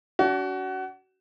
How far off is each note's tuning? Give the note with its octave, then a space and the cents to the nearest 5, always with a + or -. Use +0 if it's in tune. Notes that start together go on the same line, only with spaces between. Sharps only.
D4 -40 F#4 +25